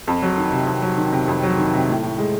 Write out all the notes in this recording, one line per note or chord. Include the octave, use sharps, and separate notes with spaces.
F2
F#3
D#3
C3
F2
F#3
D#3
C3
F2
F#3
D#3
C3
A2
A2
G#3